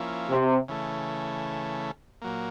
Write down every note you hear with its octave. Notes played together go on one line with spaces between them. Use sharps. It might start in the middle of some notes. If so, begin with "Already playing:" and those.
Already playing: F3 A#3 C#4 E4
C3
C#3 E3 A3
A#2 F#3 A#3